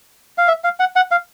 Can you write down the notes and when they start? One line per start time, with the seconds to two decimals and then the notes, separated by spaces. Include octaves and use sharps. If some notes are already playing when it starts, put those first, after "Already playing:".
0.38 F5
0.48 E5
0.64 F5
0.80 F#5
0.96 F#5
1.11 F5